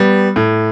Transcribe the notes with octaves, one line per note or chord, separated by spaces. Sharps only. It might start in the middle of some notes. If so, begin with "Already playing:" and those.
Already playing: G3 B3
A2